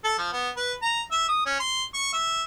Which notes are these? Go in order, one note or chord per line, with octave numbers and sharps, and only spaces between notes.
A4
F3
B3
B4
A#5
E5
D#6
C#4
C6
C#6
E5